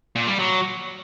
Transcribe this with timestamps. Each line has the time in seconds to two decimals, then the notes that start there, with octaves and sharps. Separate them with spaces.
0.16 A#2
0.27 G3
0.39 F#3